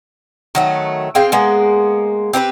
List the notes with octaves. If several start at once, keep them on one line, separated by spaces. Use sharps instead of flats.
D#3 F#3 A3
C4 G#4 F5 G5
G#3 A#3 B3
C4 G4 A#4 B4